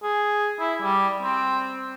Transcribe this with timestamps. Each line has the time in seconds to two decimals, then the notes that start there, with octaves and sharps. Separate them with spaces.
0.03 G#4
0.60 E4
0.82 G3
1.23 C4